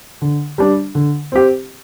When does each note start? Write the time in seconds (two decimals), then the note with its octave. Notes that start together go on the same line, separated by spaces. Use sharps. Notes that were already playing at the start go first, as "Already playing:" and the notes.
0.22 D3
0.58 G3 D4
0.95 D3
1.32 C4 G4